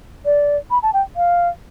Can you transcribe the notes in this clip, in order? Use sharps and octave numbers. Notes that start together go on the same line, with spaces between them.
D5
B5
A5
G5
F5